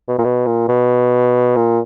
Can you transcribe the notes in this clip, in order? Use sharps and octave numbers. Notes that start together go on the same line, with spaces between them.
B2
A#2
B2
A#2
B2
A#2